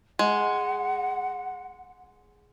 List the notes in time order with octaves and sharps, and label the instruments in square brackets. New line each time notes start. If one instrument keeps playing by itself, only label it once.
[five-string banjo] G#3 [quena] F#5